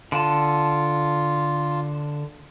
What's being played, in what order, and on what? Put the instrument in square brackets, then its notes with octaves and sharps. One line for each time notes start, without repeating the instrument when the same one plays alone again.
[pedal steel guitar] D3 A5 [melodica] F4